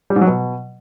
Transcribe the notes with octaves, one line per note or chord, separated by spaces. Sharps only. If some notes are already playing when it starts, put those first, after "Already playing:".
G3
G#2
F#3
B2